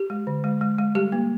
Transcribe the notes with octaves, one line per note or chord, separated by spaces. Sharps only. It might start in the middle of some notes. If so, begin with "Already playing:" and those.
Already playing: G4
G#3
D3
G#3
G#3
G#3
G3 G4
A#3